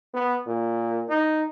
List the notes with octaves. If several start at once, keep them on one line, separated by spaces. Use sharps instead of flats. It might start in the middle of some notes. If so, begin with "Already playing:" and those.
B3
A#2
D#4